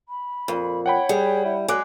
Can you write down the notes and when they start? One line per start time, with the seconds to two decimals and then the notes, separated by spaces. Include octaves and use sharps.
0.09 B5
0.48 F2 A#2
0.86 C#5 F#5 G5 B5
1.09 G3 G#4
1.45 E4
1.68 F#3 G#3 G#5 D6 F#6